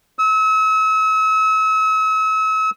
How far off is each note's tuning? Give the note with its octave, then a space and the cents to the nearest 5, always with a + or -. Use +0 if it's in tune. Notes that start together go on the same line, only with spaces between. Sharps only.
E6 -40